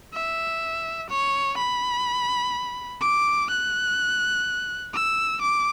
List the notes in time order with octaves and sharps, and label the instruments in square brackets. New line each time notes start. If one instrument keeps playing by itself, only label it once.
[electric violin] E5
C#5
B5
D6
F#6
E6
D6